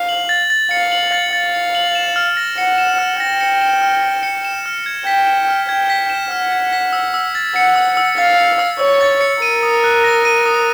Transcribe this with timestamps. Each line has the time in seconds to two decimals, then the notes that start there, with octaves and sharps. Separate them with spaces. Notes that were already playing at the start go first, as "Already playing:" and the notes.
Already playing: F5
0.09 F#7
0.29 A6
0.50 A6
0.71 F5 C#7
0.92 F#7
1.12 A6
1.33 F5 A6
1.54 C#7
1.75 F#7
1.95 E7
2.16 F6
2.37 A#6
2.58 F#5 C#7
2.78 E7
2.99 F6
3.19 G5 A#6
3.41 C#7
3.61 E7
3.82 F6
4.03 A#6
4.23 C#7
4.45 E7
4.66 F6
4.86 G#6
5.06 G5 B6
5.27 E7
5.48 F6
5.68 G5 G#6
5.90 B6
6.10 E7
6.31 F#5 F6
6.52 G#6
6.73 B6
6.93 E6
7.14 E6
7.35 A6
7.56 F#5 C#7
7.76 E6
7.97 E6
8.18 F5 A6
8.38 C#7
8.59 E6
8.79 C#5 E6
9.01 A6
9.21 C#7
9.42 A#4 D#7
9.63 D#6
9.84 F#6
10.04 A#6
10.25 D#7
10.46 D#6